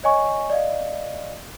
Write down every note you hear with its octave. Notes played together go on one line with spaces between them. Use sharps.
C#5 D#5 G#5 C#6
D5 D#5 F5